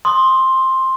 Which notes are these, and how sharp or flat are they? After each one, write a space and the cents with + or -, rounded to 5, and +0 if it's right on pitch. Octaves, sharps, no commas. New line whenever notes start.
C6 +10 D#6 -5